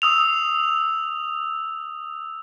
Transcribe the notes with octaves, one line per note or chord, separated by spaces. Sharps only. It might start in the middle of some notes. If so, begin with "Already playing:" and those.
D#6 E6 F7